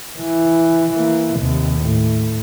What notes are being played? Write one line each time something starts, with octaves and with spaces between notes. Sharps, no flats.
E3
E3 A#3
D#2 C3
A2